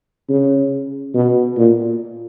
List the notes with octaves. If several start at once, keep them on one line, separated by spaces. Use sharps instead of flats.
C#3
B2
A#2